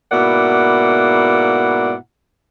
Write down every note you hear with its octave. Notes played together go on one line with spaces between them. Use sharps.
G#2 B2 A#3 E4 D5 F#5